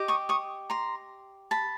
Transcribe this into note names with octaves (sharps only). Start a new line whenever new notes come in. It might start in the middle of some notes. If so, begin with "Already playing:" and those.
Already playing: G4 D#5
C#6 D#6
C#6 D#6
A#5 C6
A5 B5